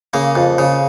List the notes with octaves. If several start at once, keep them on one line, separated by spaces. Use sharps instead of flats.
C#3 A#3
F2
C#3